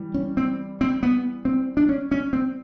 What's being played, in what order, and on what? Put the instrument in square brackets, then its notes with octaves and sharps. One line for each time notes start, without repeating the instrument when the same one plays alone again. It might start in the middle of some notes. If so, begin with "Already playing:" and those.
Already playing: [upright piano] E3 G3
[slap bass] C#4
C4
C4
B3
C4
D4
C#4
C#4
C4